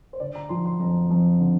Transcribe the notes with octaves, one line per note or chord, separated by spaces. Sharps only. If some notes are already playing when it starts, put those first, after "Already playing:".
C5
D3 D5
A#5
F3 C6
C6
F2 A#5
F2
D3